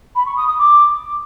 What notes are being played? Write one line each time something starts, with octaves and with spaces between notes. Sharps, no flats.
B5
C#6
D#6
D#6
D6